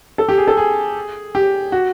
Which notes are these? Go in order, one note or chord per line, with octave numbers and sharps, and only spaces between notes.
A4
G4
G#4
A4
G#4
G4
F#4